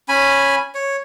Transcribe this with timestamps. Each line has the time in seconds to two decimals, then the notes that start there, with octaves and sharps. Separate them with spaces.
0.09 C#4 G#5 B5
0.75 C#5